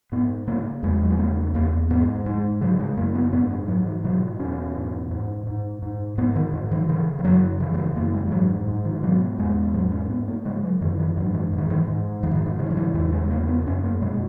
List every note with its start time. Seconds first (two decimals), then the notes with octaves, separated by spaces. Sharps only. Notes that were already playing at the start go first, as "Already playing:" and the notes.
0.12 G#2 B3
0.47 C#3 A#3
0.83 E2 G#3
1.02 F#3
1.10 G#3
1.19 C#3 A#3
1.54 E2 A#3
1.90 G#2 B3
2.26 G#2 G#3
2.61 C#3 F#3
2.79 G#3
2.97 F#2 A#3
3.15 B3
3.33 G#2 B3
3.50 G#3
3.68 G#2 F#3
3.86 E3
4.04 B2 F#3
4.40 E2 C#4
4.76 G#2
5.11 G#2
5.47 G#2
5.82 G#2
6.18 G#2 B3
6.36 D#3
6.53 G#2 D#3
6.72 E3
6.89 C#3 E3
7.19 E3
7.25 F#2 F#3
7.60 C#3 E3
7.74 F#3
7.78 E3
7.96 F#2 A#3
8.13 G#3
8.27 E3
8.31 G#2 F#3
8.67 G#2
8.85 D#3
8.94 E3
9.03 B2 F#3
9.39 E2 G#3
9.62 G#3
9.74 G#2 F#3
9.92 C#4
10.10 G#2 B3
10.28 A#3
10.45 C#3 G#3
10.63 F#3
10.81 F#2 D#3
10.99 E3
11.17 G#2 F#3
11.34 E3
11.52 G#2
11.58 D#3
11.70 E3
11.88 G#2
12.23 G#2 E3
12.31 D#3
12.46 D#3
12.59 C#3 E3
12.70 F#3
12.77 E3
12.94 E2 E3
13.13 G#3
13.30 C#3 A#3
13.48 B3
13.66 F#2 C#4
13.84 A#3
14.02 B2 G#3